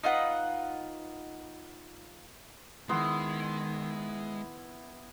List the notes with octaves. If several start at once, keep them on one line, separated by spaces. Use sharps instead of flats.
D#4 F4 B4 F#5
D#3 G#3 B3 E4 C6